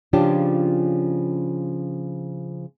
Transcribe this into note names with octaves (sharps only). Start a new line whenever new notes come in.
C#3 F3 C#4 D4 F4 G4